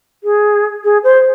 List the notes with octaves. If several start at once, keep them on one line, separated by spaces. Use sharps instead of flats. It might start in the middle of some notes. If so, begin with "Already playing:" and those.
G#4
G#4
C5